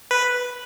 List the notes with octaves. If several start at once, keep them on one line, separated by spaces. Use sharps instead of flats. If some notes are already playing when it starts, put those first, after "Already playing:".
B4